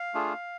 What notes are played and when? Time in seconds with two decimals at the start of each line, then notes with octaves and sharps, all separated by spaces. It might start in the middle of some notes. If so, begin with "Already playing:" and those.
Already playing: F5
0.14 A3 D4 F4 G#4